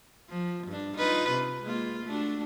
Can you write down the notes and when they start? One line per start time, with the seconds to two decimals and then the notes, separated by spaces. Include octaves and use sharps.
0.30 F3
0.68 G2 D4
0.97 D#4 F4 B4
1.30 C3
1.63 G#3 A#3 F4
2.05 A3 D4 F#4